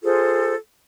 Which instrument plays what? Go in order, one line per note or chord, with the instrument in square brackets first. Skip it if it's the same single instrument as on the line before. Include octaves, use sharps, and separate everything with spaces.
[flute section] F4 G#4 A4 C5